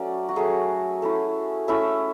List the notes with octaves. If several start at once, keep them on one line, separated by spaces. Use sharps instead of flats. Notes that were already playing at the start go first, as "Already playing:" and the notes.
Already playing: F#3 A3 C#4 D5
F#4
F#3 A3 C#4 G#4
A3 C#4 E4
A3 C#4 E4 E5